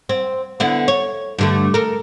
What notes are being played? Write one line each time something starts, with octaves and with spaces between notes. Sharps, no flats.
C4
D3 B3 E4
C#5
G2 D3 A3
A4 A#4